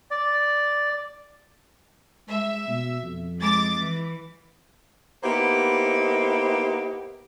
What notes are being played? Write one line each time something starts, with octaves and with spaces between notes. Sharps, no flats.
D5
G#3 E5
B2
F2
G#3 D6 A6
E3
A#3 B3 D#4 E4 G4 C5